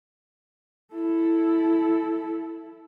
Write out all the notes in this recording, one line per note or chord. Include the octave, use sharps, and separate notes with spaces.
E4 A4